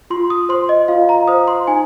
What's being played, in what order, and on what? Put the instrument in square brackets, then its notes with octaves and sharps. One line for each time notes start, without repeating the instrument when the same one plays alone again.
[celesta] F4 C6
D#6
C5 C6
D#5
F4 F5
A#5
C5 D#6
C6
D#4 G#5